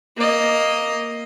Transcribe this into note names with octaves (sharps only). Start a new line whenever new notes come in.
A#3 D#5